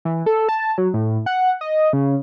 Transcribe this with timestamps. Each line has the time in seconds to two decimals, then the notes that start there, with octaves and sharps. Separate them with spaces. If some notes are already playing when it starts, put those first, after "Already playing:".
0.05 E3
0.26 A4
0.49 A5
0.78 F#3
0.94 A2
1.26 F#5
1.61 D#5
1.93 C#3